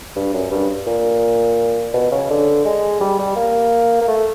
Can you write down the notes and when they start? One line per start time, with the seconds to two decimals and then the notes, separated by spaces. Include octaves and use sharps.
0.16 G2
0.33 F#2
0.51 G2
0.86 A#2
1.94 B2
2.11 C#3
2.30 D3
2.65 G#3
3.01 G3
3.19 G3
3.36 A#3
4.01 A#3
4.08 A3